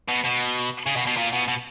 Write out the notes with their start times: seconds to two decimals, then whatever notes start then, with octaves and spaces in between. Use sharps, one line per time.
0.08 B2
0.24 B2
0.86 C#3
0.96 B2
1.07 B2
1.17 A#2
1.33 B2
1.48 B2